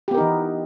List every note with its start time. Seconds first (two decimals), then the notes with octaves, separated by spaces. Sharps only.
0.08 G4
0.11 B3
0.14 A#4
0.18 D#4
0.21 E3